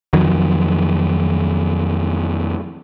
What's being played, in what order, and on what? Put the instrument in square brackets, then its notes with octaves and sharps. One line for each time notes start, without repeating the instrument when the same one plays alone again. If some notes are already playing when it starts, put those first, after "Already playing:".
[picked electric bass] F2 D#3 F#3